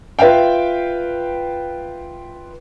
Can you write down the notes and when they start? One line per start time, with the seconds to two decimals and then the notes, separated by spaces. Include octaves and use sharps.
0.19 F4 B4 E5 F5 G5